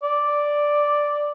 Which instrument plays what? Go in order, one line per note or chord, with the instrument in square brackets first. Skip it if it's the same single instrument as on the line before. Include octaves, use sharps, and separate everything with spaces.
[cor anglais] D5